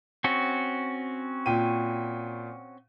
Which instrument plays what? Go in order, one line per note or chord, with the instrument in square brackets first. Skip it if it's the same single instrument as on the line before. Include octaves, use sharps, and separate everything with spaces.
[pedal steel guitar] C4 C#4 F#4
[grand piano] A#2 G5 D#7